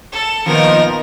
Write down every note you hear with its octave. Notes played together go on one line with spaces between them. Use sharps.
A4
A#2 D#3 F3 B3 A#4